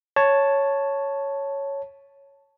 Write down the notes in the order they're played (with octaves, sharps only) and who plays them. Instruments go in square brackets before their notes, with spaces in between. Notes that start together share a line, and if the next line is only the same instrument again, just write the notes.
[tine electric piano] C#5 A5